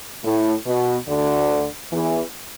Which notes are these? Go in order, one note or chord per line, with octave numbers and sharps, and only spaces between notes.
A2
B2
D2 D3
E2 E3